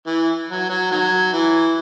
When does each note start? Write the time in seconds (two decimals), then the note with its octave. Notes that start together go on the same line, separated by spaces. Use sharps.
0.07 E3
0.49 F#3
0.70 F#3
0.91 D#3 F#3
1.33 E3